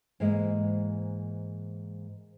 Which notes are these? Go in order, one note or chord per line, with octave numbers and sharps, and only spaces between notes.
G#2 E3 G#3 A#3 C5 D#5